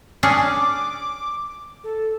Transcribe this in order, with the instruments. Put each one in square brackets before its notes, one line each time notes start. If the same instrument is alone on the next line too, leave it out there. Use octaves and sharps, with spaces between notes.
[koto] C#4 D4 G#4 [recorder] D6
[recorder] A4